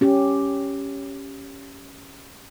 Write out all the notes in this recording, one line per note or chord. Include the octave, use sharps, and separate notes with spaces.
C#4 G4